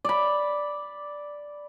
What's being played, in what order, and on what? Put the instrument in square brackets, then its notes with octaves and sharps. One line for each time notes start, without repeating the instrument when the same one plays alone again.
[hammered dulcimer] D5 B5